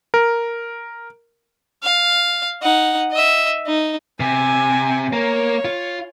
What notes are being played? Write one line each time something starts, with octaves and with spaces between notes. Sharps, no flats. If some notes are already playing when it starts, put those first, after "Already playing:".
A#4
F5
D#4 F#5
D#5 E5
D#4
C3 G#5
A#3 C#5
F4